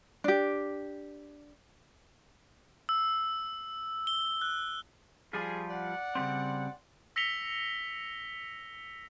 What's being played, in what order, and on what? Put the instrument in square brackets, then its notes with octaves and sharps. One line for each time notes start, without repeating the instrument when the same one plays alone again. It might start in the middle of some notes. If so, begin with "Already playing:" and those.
[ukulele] D4 G4
[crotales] E6
G7
F#6
[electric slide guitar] F3 G3 F4 [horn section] G#4
[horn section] D5 F#5
[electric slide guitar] C#3 G3 C4
[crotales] E6 A#6 B6 C#7 F7 G7